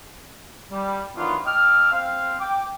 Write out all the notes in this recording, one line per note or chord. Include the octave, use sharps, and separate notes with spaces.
G3
D#3 E3 F#3 B3 D4 F4
D#5 G5 A5 D6 E6 F6
C4 F5
G5 D6